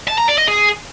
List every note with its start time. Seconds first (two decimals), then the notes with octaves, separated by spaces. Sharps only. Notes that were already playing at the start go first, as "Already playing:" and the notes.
0.08 A5
0.18 A#5
0.28 D5
0.38 D#5
0.48 G#4